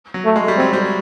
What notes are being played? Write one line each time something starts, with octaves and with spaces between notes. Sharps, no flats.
F#3
A3
G#3
G3
F#3 C4
G3